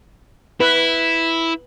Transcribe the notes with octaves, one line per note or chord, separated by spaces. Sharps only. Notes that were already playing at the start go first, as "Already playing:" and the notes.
E4 B4